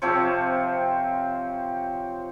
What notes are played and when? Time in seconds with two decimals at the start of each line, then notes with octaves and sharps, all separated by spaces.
0.02 C3 F3 C4 C#5